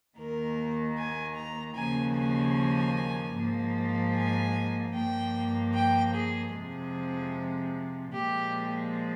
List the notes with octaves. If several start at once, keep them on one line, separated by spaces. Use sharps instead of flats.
D#2 D#3 A#3 A#4
G#5
A#5
D#2 C#3 F3 A#3 G#5
G#5
G#2 F3 A#3
G#5
G2 F3 A#3 G5
G5
G#4
F2 C3 F3 G#3 G#4
A#2 F3 G#3 G4